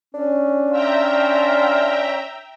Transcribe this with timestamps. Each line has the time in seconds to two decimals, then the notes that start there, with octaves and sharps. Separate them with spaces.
0.14 C#4 D4
0.72 F4 E5 G5 A#5